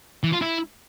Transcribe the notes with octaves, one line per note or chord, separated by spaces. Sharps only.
E3
F4
E4